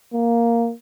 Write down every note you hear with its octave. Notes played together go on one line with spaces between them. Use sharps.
A#3